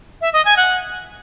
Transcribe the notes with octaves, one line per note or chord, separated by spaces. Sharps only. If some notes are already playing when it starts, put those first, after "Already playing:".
E5
D#5
G#5
F#5